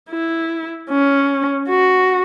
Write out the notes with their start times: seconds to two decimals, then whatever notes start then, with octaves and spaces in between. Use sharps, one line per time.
0.10 E4
0.90 C#4
1.69 F#4